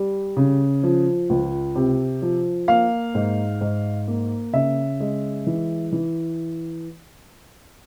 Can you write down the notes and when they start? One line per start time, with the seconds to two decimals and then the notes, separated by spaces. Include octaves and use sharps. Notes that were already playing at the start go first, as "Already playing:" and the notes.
Already playing: G3
0.37 C#3
0.83 F3
1.30 C#2
1.75 C3
2.22 F3
2.68 A#3 F5
3.15 G#2
3.61 G#2
4.08 A#3
4.53 C#3 E5
5.00 G#3
5.47 E3
5.92 E3